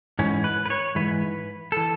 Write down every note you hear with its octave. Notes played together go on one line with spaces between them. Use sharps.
G#2 E3 C#4
B4
B4
C#5
G#2 E3 B4
E3 A4